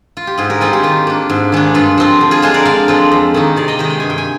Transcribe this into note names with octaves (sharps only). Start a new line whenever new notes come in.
F4
G4
G#2 F4 G#4
G4 A#4
G3 C4 D#4 F4 G#4
G4
D#3 F4
A#3 D4
G#2
D#3 G#3 D4
G2 F4
F3 C4 F4
D3
F4 G#4
G#3 D4 F4 G#4 C5
A#4 D5
D3 D5 F5
F3 G#3 C4 F4
F2
D#3 A#3 D#4
C3 D5 F5
D#5 G5
D#3 G#3 C5 D#5
G5
G2 G#5
G5
G#5